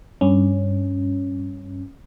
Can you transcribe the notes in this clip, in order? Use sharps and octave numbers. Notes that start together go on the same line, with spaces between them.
G2 C#4